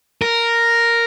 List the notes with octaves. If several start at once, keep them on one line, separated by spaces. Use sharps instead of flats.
A#4